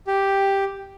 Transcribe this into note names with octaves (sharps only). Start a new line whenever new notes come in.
G4